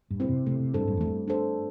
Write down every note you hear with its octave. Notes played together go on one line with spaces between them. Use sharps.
G2
A2 C4 E4 C5
C3
C3 A3
C3
G2 D4 A4 C5
G2
E2 A3
G2
D4 A4 C5